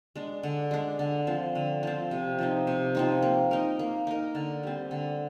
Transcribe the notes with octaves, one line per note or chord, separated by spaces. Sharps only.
G#3 D4
D3
G#3 D4
D3
F3 C4
D3
F3 C4
C3
F3 C4 D#4
C3
F3 C4 D#4
A#3
D#4 A#4
A#3
D#4 A#4
D3
G3 C4
D3